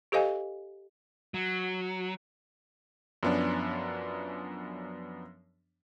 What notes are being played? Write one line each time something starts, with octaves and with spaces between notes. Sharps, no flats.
G4 A4 C5 D#5 F5 G#5
F#3
F#2 F3 B3 C#4 D4